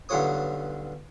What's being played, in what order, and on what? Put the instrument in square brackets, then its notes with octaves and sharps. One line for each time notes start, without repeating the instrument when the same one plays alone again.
[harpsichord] B1 G2 D3 F4 C#5 D#6